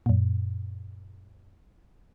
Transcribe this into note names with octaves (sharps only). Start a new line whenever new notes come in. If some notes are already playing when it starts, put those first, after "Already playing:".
F#2 A#2